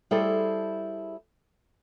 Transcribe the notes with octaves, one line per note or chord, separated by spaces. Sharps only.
G3 E4 G#4 A4 C5